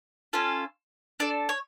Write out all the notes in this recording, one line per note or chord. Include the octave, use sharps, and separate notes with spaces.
C#4 F4 A4
D4 A4 D5
C#5